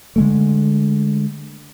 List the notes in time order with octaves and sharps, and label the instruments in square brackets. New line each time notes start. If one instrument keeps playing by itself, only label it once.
[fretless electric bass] D3 G#3 A3